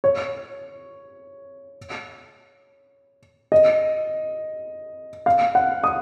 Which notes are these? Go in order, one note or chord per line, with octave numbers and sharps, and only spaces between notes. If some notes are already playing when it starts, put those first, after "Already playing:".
C#5
D#5
F5
F#5
D#6